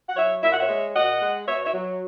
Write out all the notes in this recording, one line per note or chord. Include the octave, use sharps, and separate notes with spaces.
F#5
F#3 C#5 E5
A#2 E5
F#5
C#5 E5
G#3
A#2 D#5 F#5
G#3
B2 C#5 E5
C#5 E5
F#3